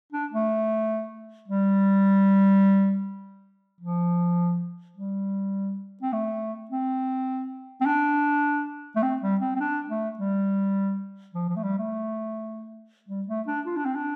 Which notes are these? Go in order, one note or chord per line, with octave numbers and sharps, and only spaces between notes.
D4
A3
G3
F3
G3
C4
A3
C4
C4
D4
A3
C4
G3
C4
C4
D4
A3
G3
F3
F3
A3
G3
A3
G3
A3
D4
F4
D4
C4
D4